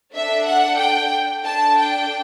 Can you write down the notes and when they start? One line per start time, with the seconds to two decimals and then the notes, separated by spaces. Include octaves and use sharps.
0.14 D4 A4 E5
0.48 F#5
0.79 G5
1.45 D4 A4 A5
1.78 G5